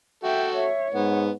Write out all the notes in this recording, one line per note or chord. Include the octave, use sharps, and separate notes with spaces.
F#4 A4 E5 G5
C#5 E5
G#2 B3 F#5